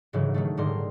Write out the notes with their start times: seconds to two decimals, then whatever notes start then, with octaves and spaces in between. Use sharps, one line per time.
0.13 G1 G#2 C#3 E3 F#3
0.34 D#3 F#3 A3
0.57 D#1 G#2 D3 G3 A#4 C6